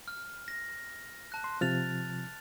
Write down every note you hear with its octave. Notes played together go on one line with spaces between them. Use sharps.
F6
A#6
A5 F#6
C6
C3 F3 F6 A6 F7